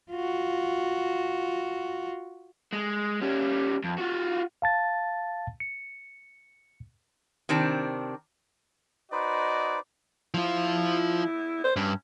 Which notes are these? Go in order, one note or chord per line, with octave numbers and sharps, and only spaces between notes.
F4 F#4
G#3
G3 C#4
F2
F4 F#4
F5 A5 A6
C#7
C3 D#3 C4 D4
D#4 F#4 B4 C5 D5 D#5
F3 E4 F4
C5
G2 C#4